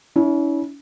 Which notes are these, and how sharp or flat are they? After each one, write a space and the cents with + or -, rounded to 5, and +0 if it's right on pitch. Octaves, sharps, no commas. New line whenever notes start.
C#4 +35 E4 -30